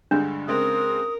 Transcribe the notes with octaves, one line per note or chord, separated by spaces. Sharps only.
G2 D3 G#3 D4
C#3 G#3 C4 A#4 D#6